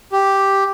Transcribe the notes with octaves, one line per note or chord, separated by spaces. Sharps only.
G4